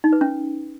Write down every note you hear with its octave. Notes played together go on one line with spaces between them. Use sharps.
D#4
B4
C#4